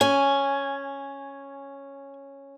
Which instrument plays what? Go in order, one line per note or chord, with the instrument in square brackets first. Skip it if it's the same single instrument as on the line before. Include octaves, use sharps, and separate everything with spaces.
[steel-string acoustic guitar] C#4 [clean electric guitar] G#5